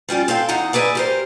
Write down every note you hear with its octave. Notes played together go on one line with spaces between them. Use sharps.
G3 C#4 F4 D5
C4 A4 F5 G5
E2 D#4 F#5 A#5
G#4 B4 D5 E5
G4 A#4 C5